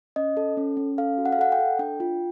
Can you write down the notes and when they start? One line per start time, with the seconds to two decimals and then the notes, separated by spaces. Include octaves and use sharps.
0.16 C#4 D#5
0.37 A4
0.57 C#4
0.77 C#4
0.98 A4 F5
1.18 F#4
1.25 F#5
1.32 F5
1.39 A4 F#5
1.52 G5
1.59 A4
1.79 D4 G5
2.00 F4